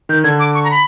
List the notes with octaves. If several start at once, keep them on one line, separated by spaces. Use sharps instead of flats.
D#3 G6
D3 G#6
D6
C#6
A#5
B5